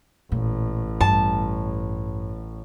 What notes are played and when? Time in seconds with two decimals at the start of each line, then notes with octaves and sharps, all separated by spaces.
0.32 A1 A#2
1.01 G2 A5